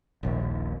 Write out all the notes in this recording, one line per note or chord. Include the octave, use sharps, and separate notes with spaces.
D#1 A#1 D#2